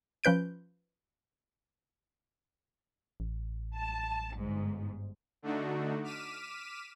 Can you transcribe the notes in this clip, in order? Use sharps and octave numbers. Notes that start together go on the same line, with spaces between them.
F3 C#4 B4 G6 D7
A1
A5
G1 G#2
D3 A3 D4 D#4 F#4
D6 F6 B6 D#7 E7